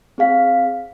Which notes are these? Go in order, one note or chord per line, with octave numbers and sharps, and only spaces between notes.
C4 G#4 F5 B6